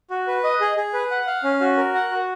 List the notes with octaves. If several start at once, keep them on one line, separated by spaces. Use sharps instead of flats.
F#4
B4
D#5
G#4
G#4
B4
F#5
F5
C#4
F#4
A#4
F#5
F#4